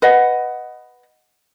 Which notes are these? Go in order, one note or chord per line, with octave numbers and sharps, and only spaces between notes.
B4 D#5 F#5